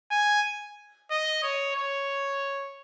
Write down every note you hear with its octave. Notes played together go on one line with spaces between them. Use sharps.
G#5
D#5
C#5
C#5